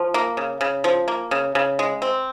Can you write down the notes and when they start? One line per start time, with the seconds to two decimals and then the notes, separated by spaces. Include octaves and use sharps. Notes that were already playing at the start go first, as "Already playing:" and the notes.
Already playing: F3
0.14 A#3
0.37 C#3
0.61 C#3
0.84 F3
1.08 A#3
1.31 C#3
1.55 C#3
1.79 G#3
2.02 C4